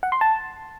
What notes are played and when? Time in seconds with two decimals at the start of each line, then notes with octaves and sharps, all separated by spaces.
0.03 F#5
0.12 C6
0.21 A5